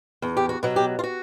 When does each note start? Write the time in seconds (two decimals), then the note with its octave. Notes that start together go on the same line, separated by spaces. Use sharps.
0.22 E2
0.37 G4
0.49 F#4
0.63 B2 F#3
0.76 G4
0.99 F4
1.04 F#4